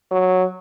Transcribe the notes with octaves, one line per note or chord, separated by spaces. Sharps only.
F#3